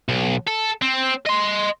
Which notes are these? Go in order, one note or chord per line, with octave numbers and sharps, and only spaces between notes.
B1
A4
C4
D#5 C6